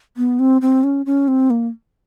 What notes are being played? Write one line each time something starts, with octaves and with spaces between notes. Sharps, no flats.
B3
C4
C4
C#4
C#4
C4
A#3